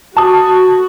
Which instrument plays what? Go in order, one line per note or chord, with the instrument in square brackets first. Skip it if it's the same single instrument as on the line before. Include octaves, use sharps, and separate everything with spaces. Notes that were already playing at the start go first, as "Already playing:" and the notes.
[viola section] F#4 [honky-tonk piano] A5 D#6